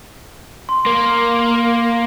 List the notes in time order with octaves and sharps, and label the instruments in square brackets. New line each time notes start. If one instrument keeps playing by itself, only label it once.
[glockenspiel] C6
[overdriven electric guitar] A#3